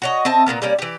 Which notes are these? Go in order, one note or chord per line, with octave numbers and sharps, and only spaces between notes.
F#4 C#5 D#5
C4 D#5 E5 A5
A#2 C#3 A#3 B3
G3 A#3 C#4 D5
E3 G4